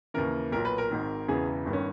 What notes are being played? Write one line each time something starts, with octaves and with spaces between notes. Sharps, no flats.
D#2 C#3 E3 A#4
B1 A#2 A#4
B4
A#4
G#1 G#2 D#3
E1 E2 C#3 E3 G#4
G1 G2 D#3
C#4